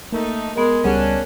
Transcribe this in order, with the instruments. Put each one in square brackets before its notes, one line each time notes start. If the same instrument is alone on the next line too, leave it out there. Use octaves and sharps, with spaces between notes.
[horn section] A3 D#4 [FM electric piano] A#3
[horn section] G#3 [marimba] B3 A#4
[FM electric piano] C#2 G3 [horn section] C#4 D4 [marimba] G#4 F#5